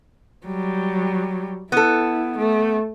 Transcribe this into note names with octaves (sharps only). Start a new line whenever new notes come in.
F#3 G3
B3 E4 A4
A3